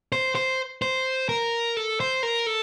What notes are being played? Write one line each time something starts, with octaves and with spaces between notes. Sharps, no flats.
C5
C5
C5
A#4
A4
C5
A#4
A4